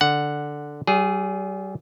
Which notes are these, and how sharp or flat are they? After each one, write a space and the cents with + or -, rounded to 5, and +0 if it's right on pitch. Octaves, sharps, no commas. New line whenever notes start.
D3 +0 F#5 +0
G3 -40 G#4 +0